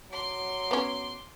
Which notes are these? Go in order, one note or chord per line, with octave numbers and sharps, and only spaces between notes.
F#3 C6 D6
B3 C#4